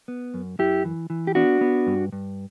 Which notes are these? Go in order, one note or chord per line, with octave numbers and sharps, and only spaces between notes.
B3
F#2
F#2 E4 G4
E3
E3
G4
B3 D4 F#4
B3
G2
G2